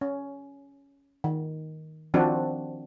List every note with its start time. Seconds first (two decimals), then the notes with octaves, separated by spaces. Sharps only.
0.01 C#4
1.24 D#3
2.14 D#3 F3 C4 D4 F#4